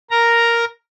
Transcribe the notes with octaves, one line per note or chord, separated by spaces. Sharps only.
A#4 A#5